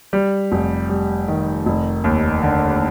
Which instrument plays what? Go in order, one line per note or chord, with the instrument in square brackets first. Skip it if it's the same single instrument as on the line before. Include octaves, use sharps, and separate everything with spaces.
[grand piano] G3
F1
G3
D#3
F1
D#2
D3